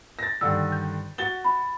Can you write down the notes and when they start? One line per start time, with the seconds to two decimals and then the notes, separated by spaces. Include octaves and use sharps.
0.19 A6 A#6
0.41 G2 D3 D#3 E6
0.72 G6
1.18 F#4 A6 G7
1.45 B5